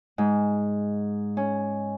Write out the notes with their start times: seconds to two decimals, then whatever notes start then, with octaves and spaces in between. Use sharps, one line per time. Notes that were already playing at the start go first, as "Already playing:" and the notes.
0.18 G#2
1.37 C#4